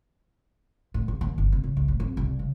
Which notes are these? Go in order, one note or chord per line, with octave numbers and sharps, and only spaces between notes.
A2
A#1
D#2
G1
C3
C#3
C#2
A2
F2
C2
C#3